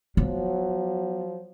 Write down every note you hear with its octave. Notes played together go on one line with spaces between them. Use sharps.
F3 F#3 B3